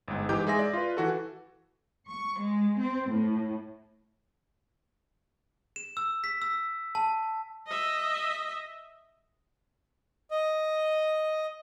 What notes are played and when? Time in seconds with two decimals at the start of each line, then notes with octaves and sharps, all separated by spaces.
0.08 G1 G#2
0.29 G#2 E3 D#4 G4 G6
0.47 G#3 G#4 E5 A#6
0.59 D5 E5
0.73 F4 B4
0.97 E3 F#4 A4
2.07 C#6
2.39 G#3
2.79 C4
3.09 A2
5.76 E7
5.97 E6
6.24 B6
6.42 E6
6.95 A5
7.66 D#5 E5
10.31 D#5